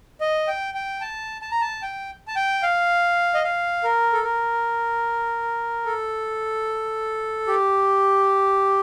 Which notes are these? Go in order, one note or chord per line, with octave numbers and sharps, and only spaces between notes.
D#5
G5
G5
A5
A5
A#5
A5
G5
A5
G5
F5
D#5
F5
A#4
A4
A#4
A4
G4